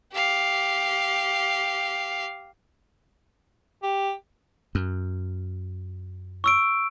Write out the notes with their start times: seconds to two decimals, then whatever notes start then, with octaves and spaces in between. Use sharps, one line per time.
0.13 G4 F5
3.83 G4
4.75 F#2
6.44 C#6 E6 D7